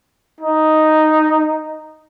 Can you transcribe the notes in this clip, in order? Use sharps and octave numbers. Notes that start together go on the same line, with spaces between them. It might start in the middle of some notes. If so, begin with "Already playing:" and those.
D#4